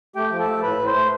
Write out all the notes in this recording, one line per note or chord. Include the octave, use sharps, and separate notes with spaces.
A3 G4 G5
F3
A4 A5
A3
A2 B4 B5
A2
C5 C6
A3